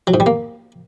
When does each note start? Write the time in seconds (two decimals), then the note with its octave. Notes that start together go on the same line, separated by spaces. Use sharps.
0.07 F#3
0.14 G#2
0.20 G3
0.26 A#3